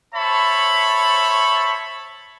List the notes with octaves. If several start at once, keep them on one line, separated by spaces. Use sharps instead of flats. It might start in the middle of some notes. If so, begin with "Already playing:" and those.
C5 C#5 E5 A5 B5 C#6